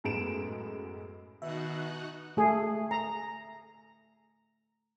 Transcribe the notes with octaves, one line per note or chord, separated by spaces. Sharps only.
F#2 A2 G#3 B3 D7 E7
B2 D#3 D#4 F#4 E5 F#5
A3 G#4
A#5